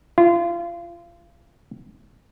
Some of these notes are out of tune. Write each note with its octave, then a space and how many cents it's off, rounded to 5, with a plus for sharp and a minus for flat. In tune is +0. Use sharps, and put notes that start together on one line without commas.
F4 -30